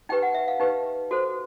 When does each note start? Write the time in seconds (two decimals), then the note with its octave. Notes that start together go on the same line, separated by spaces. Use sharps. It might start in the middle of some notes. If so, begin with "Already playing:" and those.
0.09 D#4 G4 B4 G5
0.23 F#5
0.34 E5
0.48 F5
0.60 D#4 G4 B4
1.11 F#4 A4 C5